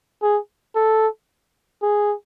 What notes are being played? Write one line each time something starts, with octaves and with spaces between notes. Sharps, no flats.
G#4
A4
G#4